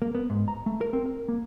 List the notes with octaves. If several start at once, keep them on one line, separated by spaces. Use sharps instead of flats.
A#3
B3
G#2
A#5
A3
A#4
C4
A#4
A#3